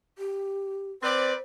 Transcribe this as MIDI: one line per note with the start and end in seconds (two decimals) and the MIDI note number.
0.18 0.92 67
1.03 1.33 60
1.03 1.33 71
1.03 1.42 72
1.03 1.33 74